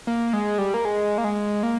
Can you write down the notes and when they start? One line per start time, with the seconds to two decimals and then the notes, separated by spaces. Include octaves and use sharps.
0.07 A#3
0.33 G#3
0.58 G3
0.74 A#3
0.85 G#3
1.18 A#3
1.24 G#3
1.63 A#3